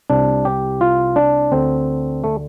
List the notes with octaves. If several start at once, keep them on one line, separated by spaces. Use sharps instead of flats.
C2 C3 D4
G4
F4
D4
D2 D3 C4
A3